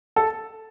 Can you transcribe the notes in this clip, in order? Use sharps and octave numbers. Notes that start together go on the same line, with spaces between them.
A4